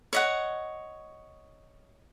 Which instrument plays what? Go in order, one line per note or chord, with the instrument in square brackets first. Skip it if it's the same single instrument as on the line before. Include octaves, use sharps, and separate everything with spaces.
[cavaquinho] C#5 D#5 F#5